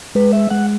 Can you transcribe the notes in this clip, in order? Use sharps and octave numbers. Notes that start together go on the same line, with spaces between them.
G#3 B4
E5
G#3 F#5